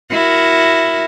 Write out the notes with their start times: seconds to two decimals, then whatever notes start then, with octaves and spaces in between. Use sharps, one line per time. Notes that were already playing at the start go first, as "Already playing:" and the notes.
0.11 E4 F#4 A#4